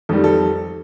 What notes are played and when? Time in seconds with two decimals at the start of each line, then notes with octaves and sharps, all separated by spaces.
0.09 F2 D#3 G3 A4
0.24 A4